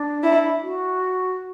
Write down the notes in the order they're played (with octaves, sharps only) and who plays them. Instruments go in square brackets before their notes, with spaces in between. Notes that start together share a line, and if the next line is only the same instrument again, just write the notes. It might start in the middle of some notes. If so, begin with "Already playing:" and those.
Already playing: [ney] D4
[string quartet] E4
[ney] F#4